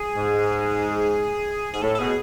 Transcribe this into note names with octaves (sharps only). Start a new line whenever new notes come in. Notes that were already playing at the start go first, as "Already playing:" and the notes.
Already playing: G#4
G#2
G#2 G#4
A2 A4
A4
B2 G#4